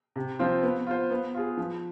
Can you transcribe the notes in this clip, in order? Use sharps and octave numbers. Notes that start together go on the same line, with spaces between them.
C3
F3 C4 F4 C5
B3
F4 C5
B3
F4 G#4
F3